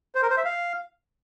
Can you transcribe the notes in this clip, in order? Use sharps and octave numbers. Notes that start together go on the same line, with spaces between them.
C5
A#4
C5
E5
F5